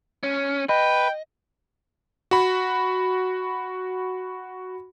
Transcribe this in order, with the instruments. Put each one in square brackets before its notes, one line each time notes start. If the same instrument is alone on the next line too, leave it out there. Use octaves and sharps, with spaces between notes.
[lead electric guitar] C#4
[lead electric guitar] B4 [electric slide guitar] D#5 [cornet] G5
[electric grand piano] F#4 B5